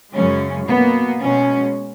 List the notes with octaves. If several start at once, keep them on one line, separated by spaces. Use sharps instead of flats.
F#2 C#3 G#3 C#4
B2 A#3 B3
B2 G#3 C#4